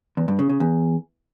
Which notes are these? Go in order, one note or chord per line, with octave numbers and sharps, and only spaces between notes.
E2
G2
C#3
C#3
E2